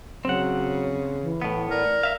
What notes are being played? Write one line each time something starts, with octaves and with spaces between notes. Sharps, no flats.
C#3 F#3 C4 F#5
E3
A2 B3
A#4 D5
E5 F5